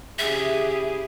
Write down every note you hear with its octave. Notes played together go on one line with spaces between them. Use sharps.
C#3 E4 G4 G#4 E5